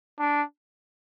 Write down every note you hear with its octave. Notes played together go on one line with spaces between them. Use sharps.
D4